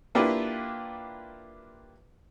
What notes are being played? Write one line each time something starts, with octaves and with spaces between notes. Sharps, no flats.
A#3 D4 E4 F4 G4 B4